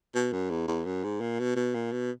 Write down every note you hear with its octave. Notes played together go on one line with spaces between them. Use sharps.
B2
F#2
E2
E2
F#2
G#2
A#2
B2
B2
A#2
B2